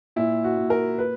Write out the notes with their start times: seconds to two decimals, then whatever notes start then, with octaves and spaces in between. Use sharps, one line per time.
0.16 A#2 E4
0.44 F#4
0.57 A#2
0.70 A#4
0.98 B4